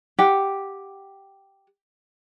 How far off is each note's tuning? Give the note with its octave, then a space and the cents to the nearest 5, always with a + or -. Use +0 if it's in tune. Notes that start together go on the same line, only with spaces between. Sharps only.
G4 +0 F#5 +0